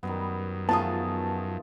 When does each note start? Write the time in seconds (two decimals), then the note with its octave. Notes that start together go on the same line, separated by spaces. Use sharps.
0.03 F#2 D#3 G3 B3
0.69 D#3 F3 A3 B3 F4 G#4 A5 D#6